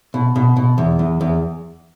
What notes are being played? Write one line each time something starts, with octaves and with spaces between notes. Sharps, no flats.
B2
B2
B2
E2
E2
E2